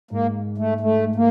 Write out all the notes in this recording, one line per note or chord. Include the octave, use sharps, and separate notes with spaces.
G#2 A#3
A3
A3
A#3